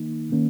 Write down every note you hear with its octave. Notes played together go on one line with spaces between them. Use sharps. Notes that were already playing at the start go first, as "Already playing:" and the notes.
Already playing: D#3 A#3 D#4
D#3 A#3 C#4